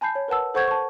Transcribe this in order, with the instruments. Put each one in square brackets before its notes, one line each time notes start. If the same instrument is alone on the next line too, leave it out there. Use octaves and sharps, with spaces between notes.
[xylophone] G#5 A5 B5 G6 C7
C#5
A#4 B4 F#5 A5 E6
A4 C5 F#5 C#6 G6 G#6
A5 C#6